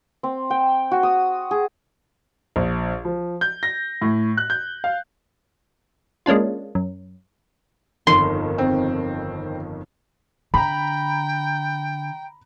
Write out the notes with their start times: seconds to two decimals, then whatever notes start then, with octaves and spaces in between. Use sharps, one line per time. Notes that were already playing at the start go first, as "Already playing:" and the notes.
0.23 C4
0.50 G5
0.91 F#4
1.03 D#6
1.51 G#4
2.56 A#1
3.05 F3
3.41 G6
3.63 A#6
4.01 A2
4.37 F#6
4.50 G6
4.84 F5
6.26 G#3 A#3 C#4 D4 F4
6.75 F#2
8.07 G1 F2 D#3 C6
8.58 C4
10.54 D3 G5 A#5 B5